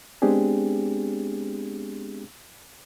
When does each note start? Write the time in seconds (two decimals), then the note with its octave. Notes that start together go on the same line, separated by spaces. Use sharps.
0.22 G#3 B3 C4 D4 G4 G#4